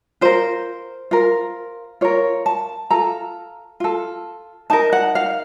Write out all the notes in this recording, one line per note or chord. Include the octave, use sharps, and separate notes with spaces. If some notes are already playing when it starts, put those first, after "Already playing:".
F4 A#4 C5
F4 A#4
F4 A#4 C#5
A5
F4 A4 A#5
F4 A4
D#4 A#4 A5
F#5
F5